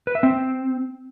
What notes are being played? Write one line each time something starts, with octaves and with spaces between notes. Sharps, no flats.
B4
E5
C4